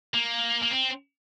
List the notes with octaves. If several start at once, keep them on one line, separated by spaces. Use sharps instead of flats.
A#3
A#3
C4